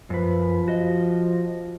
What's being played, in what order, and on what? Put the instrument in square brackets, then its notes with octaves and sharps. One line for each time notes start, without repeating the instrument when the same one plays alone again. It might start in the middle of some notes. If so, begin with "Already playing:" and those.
[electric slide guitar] F#2 B4 [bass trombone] F3
[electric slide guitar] F#4 D#5